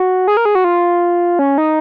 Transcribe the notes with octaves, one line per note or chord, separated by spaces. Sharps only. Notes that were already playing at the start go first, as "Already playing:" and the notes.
Already playing: F#4
G#4
A#4
G#4
F#4
F4
C#4
D#4